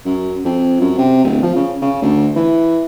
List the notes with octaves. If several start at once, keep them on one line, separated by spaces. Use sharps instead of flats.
F#2
F2
F#2
C3
D1
F3
C#3
C#3
D2
E3